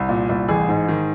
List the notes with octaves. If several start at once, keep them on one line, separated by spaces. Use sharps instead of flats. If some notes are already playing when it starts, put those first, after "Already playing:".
Already playing: C2
A#2
C2
A1 G#4
G#2
D#3